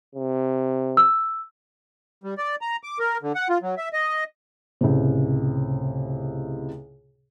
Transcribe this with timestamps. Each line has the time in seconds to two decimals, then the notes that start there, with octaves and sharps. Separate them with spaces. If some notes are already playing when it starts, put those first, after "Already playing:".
0.15 C3
0.97 E6
2.24 G3
2.38 D5
2.61 A#5
2.84 D6
2.99 A#4
3.22 D3
3.35 F#5
3.49 F4
3.62 F#3
3.77 E5
3.93 D#5
4.81 C#2 A2 C3